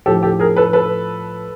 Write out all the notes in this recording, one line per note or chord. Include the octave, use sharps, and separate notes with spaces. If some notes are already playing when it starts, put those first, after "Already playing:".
A2 F3 G4 A4
G4 A4
G#4 A#4
A4 B4
A4 B4